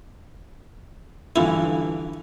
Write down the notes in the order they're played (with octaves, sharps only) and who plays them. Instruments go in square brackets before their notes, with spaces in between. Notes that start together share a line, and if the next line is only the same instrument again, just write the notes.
[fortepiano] G2 D3 E3 [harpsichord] E4 F4